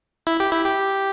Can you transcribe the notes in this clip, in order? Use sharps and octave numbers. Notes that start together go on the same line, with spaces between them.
E4
G4
E4
G4